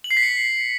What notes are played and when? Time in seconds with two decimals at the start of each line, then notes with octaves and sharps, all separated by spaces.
0.04 F#7
0.11 C7
0.17 B6
0.23 C#7